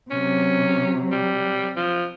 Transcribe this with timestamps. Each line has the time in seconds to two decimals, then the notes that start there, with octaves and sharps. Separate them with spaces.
0.11 C3 F#3 C#4
1.11 G3
1.76 F3